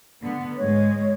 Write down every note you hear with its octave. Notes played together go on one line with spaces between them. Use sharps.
D3 B3
G#2 G#3 C#5